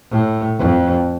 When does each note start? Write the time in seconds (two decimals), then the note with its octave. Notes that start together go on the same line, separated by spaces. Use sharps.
0.11 A2
0.58 F2